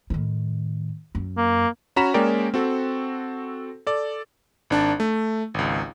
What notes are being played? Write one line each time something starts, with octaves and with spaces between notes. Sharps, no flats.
A2 D#3
F#2
A#3
C#4 F#4 A#5 B5 B6 E7
G#3 A#3 C#4 A#4 D5 G5
C4 F#4 A4
A4 D5
G#1 D4 A5
A3
G#1 C#2